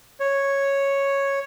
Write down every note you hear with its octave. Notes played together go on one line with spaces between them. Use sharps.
C#5